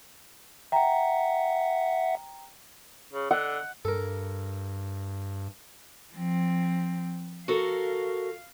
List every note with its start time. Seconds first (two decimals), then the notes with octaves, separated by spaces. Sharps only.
0.72 E5 F#5 G5 A#5
3.13 C#3
3.31 D3 F#5
3.85 G2 A4 A#4
6.14 F3 C4
7.48 F#4 A4 A#4 F5